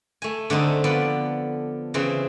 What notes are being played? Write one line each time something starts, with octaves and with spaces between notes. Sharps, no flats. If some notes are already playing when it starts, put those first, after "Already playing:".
A3 G#5
D3 A3 C4 D#4
F3 B3 D5
C#3 E3 C4